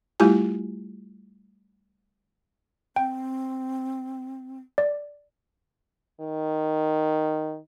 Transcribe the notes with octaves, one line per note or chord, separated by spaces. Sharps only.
G3 A3 E4 F4 G4 G#5
C4 G5
D5
D#3